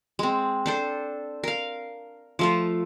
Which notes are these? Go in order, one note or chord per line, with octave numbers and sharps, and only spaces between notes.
G#3 C4
D4 A4 C5
A#4 F5
F3 A3 F4